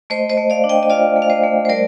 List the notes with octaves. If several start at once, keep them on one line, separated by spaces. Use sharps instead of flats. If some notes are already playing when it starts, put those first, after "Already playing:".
A3 C5 D#5
C5 D#5
A3
D5 F5
D4
D#5 G5
D#5
F4 D5 F5
A3
F5
C5 D#5
A3
C5
G3 A#4 D5